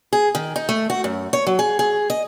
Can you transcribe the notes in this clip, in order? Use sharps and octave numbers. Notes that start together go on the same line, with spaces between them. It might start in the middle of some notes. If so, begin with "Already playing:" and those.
G#4
D#3
D#4
A3
F#4
F#2
C#5
F#3
G#4
G#4
D#5